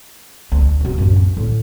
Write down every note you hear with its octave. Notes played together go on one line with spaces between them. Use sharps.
D2 A3
D#1 B2
A1 F#2
C#4
A2 D3